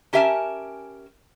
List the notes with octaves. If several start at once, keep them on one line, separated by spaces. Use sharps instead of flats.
C#4 G4 A#4 E5 G#5 A5